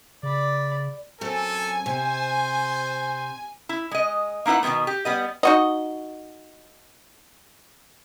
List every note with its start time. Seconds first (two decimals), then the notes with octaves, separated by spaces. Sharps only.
0.23 C#3 D5 B5
1.21 F#2 F#3 C4 A4 G#5
1.86 C3 C5
3.69 E4
3.91 G#3 D#5
4.46 A#3 D#4 E4 B4 F#5
4.63 B2 D#3 F#3 G#3 B3
4.87 G4
5.05 G3 B3 D#5
5.43 D#4 F#4 D#5